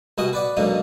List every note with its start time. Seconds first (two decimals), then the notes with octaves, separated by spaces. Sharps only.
0.18 C2 B2 F#4 D#5 G#5
0.33 B4 D5 F#5
0.57 G#2 B2 D3 F#3 A#3 D#4